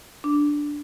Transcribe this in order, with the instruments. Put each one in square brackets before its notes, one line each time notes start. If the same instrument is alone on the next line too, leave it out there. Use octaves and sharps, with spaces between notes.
[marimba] D4